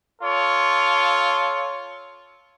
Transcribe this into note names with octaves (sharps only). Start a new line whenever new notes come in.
F4 A4 C#5